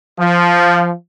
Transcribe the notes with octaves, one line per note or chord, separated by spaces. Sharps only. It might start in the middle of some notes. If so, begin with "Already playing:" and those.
F3